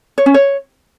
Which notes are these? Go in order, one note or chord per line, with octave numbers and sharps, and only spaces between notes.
C#5
C#4
C#5